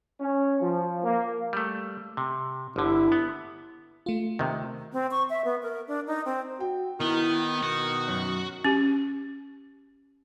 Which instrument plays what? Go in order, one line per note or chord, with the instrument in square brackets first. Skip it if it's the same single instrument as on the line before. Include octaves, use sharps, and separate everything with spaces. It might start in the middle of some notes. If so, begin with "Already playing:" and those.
[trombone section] C#4
F3
A#3
[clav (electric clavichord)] G3 A3
C3
[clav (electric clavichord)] G1 D3 [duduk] E4
[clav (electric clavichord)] B3
[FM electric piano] A3 F4
[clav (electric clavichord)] C3 D#3
[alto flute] C4
C#6
E5
B3
A#4
D4
D#4
C4
[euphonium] F#4 [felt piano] G5
[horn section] D#3 [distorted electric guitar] B3 [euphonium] E4
[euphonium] B2 [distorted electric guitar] F#4
[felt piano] F#2
[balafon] C#4 G4